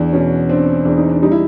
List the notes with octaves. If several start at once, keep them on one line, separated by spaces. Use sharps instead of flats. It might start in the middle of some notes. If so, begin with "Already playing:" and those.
Already playing: E2 D4
B2 C#4
C4 D4
E2 D4
D#4
D4
G3 D#4
E4